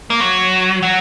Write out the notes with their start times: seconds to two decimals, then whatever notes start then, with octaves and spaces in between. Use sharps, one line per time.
0.10 A#3
0.21 F#3
0.83 F#3